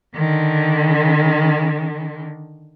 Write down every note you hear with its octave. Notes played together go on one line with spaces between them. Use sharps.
D3 D#3